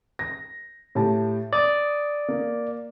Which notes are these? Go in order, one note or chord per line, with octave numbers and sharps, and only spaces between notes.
A#6
A2 G4 A5
D5 D#6
A#3